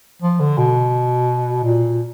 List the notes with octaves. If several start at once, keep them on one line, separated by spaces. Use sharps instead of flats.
F3
D3
B2
A#2